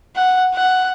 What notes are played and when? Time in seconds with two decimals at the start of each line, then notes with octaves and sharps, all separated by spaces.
0.16 F#5
0.54 F#5